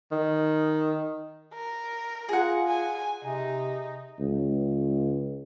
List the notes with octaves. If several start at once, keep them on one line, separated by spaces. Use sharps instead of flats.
D#3
A#4
F4 G#4 F#5
G#5
C3 D#4
C#2